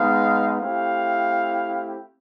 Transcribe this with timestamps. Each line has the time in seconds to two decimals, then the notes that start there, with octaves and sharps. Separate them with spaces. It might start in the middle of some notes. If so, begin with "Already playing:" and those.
Already playing: G#3 B3 D#4 F5
0.59 A3 C4 E4 G4 F5